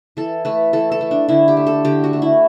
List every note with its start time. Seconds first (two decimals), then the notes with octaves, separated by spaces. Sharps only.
0.17 E3 A4
0.45 A3 B4
0.73 E3 A4
0.92 A4
1.01 A3
1.11 D4
1.29 D3 E4
1.48 G4
1.57 A3
1.67 A4
1.85 D3 G4
2.04 F#4
2.13 A3
2.22 E4